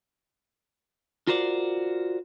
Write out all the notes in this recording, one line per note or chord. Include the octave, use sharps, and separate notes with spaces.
F4 F#4 A#4 C5 D5